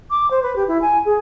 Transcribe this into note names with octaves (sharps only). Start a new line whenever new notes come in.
D6
C5
B4
G4
E4
G#5
G#4